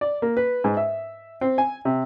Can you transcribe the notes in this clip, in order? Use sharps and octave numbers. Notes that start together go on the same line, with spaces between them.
D5
A#3
B4
G#2
E5
C4
G#5
C3